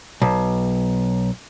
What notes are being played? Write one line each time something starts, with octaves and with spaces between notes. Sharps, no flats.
B1